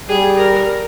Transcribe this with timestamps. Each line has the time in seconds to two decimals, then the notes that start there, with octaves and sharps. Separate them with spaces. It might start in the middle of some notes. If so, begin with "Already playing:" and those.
0.09 G3 G#4
0.37 A#4